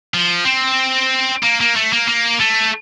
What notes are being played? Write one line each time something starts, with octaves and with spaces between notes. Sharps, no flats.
F3
C4
A#3
A#3
A3
A#3
A#3
A3